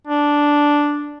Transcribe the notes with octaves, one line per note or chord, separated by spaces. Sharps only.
D4